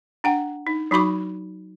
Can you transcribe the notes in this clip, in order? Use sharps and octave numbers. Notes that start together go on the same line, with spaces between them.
D4 F#5 G5
D#4
F#3 D#4 F#4 B5 D6